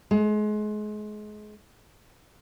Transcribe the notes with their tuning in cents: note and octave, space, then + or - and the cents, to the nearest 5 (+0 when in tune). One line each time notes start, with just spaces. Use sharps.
G#3 +30